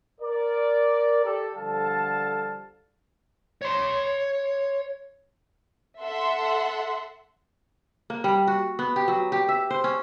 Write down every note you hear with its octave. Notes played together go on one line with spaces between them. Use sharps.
A#4 D5
G4 A4 D5
D3 F3 G3 A4 F5 A5
C#5 C6
A4 E5 F#5 C6
A#3
G3
F#4
B3
G4
F#3
G4
E5
C5
C#4